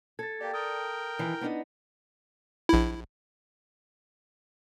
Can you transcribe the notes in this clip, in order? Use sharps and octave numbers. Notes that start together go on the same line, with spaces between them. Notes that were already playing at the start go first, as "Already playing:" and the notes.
A4 G#6 A6
A#3 G4 D5 G5
A#4 G5 D#6
D#3 E3
B3 D4 D#4
A#1 E4